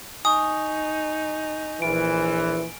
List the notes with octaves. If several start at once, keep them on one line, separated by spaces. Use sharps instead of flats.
D#4 G#5 C#6 D#6
A#1 E3 F4 D7